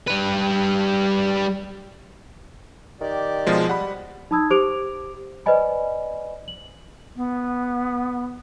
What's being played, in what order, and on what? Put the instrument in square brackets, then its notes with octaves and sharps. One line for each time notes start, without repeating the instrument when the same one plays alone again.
[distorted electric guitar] G3 B4
[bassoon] D#3 [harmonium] G4 D5
[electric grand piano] B2 F3 G#3
[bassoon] G3 [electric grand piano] F#5 B5
[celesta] D#4 A5 B5 D#6 E6 G#6
G4 C5 D6 D7 F7
B4 C5 D5 D#5 G#5 B5
F#7
[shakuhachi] B3